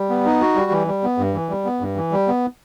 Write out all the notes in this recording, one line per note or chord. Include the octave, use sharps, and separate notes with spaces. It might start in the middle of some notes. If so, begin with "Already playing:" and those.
Already playing: G3
B3
D#4
F#4
G3
E3
G3
B3
G2
E3
G3
B3
G2
E3
G3
B3